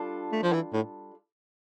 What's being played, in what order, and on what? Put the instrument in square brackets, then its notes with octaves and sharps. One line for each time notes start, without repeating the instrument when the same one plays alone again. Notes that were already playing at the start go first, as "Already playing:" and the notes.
Already playing: [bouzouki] G3 D4 F4 A4
[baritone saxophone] A3
F3
E3
A2